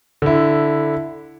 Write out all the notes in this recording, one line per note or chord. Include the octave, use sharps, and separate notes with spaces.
D3 E4